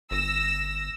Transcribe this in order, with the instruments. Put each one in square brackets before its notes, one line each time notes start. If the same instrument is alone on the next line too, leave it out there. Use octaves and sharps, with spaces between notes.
[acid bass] G1 [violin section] E6 A#6